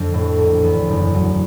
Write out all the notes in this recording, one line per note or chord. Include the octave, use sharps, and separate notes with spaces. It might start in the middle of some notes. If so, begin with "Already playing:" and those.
Already playing: F2 D3 F3
A2
A#1
E2
F#1
F#3